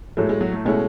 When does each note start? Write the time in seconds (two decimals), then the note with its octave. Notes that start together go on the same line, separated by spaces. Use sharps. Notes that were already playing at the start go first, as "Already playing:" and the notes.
0.17 A2 F#3 G#3 A3
0.29 G#3
0.41 F#3
0.53 A3
0.65 B2 G#3 A3 C#4 E4